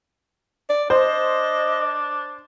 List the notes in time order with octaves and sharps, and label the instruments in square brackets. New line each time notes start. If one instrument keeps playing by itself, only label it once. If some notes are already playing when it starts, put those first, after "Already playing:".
[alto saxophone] D5
[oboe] D4 [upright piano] C5 [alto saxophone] D#5